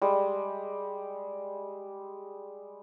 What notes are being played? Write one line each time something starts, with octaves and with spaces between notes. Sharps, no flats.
G3 G#3